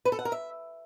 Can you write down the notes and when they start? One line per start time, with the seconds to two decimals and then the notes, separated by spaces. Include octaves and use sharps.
0.05 B4
0.12 A4
0.19 F#5
0.25 A#4
0.32 E5